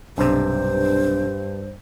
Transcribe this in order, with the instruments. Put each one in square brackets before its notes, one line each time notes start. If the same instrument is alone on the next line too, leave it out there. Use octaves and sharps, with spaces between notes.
[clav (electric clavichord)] B1 C3 [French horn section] G2 [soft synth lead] D4 [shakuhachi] C5